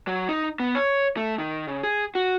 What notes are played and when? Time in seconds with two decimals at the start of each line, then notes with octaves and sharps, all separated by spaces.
0.08 F#3
0.29 D#4
0.60 B3
0.75 C#5
1.17 A3
1.38 D#3
1.67 C#3
1.83 G#4
2.15 F#4